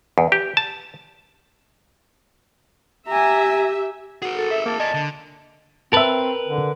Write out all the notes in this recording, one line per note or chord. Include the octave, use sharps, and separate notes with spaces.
E2
G4
A5
G4 E5 G#5 A#5
F#4 G#4 A#4
A4
E5
A#3 A5
D5 D#5 G#5 A5
D3
C4 A#4 B4 E5 A5
D3